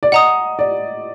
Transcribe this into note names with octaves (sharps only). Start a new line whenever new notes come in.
D5
D#5 F#5 A#5 D#6
D5